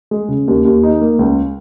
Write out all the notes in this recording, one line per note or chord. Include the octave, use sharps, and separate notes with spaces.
G#3
C#3
D#2
D#2
D#4
A#3
C#2